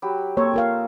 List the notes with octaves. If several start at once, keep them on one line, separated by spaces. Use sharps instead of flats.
F#3 G4 B5
A#3 C4 A4 C#5 A#5
F4 A#4 F5